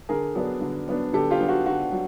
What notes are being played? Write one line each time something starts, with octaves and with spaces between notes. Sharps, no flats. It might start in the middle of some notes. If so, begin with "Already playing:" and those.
D3 G#4 A#4
F#3 B3 D4
D3
F#3 B3 D4
D3 G4 A4
F4 G4
F#3 B3 D4
F#4
D3 F#4
F#3